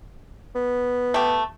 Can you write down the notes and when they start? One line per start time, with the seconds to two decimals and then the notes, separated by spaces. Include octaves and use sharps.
0.55 B3
1.14 A3 G4